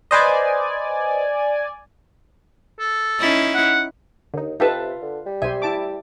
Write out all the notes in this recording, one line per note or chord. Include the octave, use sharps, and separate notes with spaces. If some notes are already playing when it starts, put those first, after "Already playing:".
B4 C5 D5 D#5 G#5
A4
C#4 D#4 E4
F#5
D#2 D3 D#4
C3 D#4 F4 G4 A4 B4 E5 A5
D3
G3
B1 G4 C5 E5 G#5
E4 A5 D6